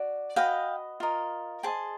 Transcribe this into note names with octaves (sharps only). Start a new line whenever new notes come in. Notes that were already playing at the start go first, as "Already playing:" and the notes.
Already playing: F#4 D5
F#4 B4 D#5 F5 G5
F4 A#4 D#5
G#4 C5 D#5 G5 A5